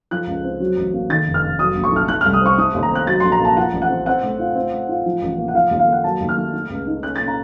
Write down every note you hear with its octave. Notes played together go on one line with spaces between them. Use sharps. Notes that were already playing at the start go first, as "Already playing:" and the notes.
F3 F#6
C#2
C4
F#3
A1
A#3
D#3 A6
F1
F6
F1
F#3 D#6
A#1
C#6
A3 F6
A3 F#6
C2 F6
D#6
C4 C#6
A3 D#6
D#2
A#5
C4 F#6
F#3 A6
A#1 C6
A#5
A#3 A5
F3 F#5
A1
F#5
C4
C4 F#5
A2
F4
C4
A2
F4
F3
A1
A#3
F#5
F3 F5
D#2
F5
A#3 F#5
F#3 A5
D#2
F6
A3
A3
C#2
D#4
C#4 F#6
A#2 A6
A#5